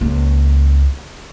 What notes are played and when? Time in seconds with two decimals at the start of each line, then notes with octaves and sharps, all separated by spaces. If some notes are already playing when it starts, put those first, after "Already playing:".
0.01 C#2 A#3